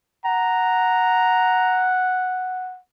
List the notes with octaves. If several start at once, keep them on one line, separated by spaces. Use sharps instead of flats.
F#5 A#5